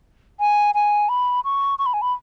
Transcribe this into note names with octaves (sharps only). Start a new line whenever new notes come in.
G#5
G#5
B5
C#6
C#6
B5
G#5
B5